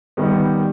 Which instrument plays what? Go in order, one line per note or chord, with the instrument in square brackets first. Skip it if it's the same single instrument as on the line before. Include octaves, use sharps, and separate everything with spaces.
[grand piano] D#3 G3 B3